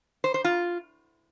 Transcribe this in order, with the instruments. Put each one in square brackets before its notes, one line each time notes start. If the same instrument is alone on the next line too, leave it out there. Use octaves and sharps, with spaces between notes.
[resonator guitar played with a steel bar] C5
C5
F4